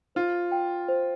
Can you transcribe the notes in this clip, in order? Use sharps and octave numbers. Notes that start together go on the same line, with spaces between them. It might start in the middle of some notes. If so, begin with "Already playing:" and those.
F4 C5
G5
C5